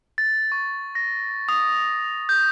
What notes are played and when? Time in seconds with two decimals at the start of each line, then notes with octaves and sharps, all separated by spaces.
0.18 A6
0.52 C#6
0.95 A#6
1.48 D#6
2.29 G6